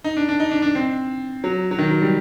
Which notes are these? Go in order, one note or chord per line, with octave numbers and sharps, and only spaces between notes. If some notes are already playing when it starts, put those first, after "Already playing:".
D#4
D4
D4
D#4
D4
D4
C4
F#3
F#3
D#3
F#3
G3